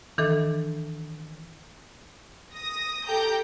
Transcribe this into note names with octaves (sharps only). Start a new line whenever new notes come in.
D#3 E3 D4 A4
D#6 A#6
G4 A4 G5 A#5 G6